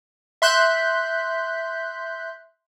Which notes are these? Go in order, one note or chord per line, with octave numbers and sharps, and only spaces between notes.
E5 C6 F#6 G6 B6